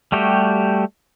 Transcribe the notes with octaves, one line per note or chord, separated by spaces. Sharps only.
G3 A3 F#4 G4